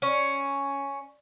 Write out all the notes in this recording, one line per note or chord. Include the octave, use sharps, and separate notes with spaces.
C#4